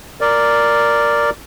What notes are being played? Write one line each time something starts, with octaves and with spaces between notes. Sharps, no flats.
A#4 D5